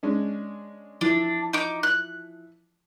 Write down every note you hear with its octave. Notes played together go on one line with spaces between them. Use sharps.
G#3 C#4 D4
E3 F3 D4 E4
D#4 D6
F#6